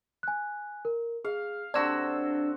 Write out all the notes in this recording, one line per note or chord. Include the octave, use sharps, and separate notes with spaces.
G#5 F#6
A#4
G#4 F5
C3 D4 F#4 A4 E6 G#6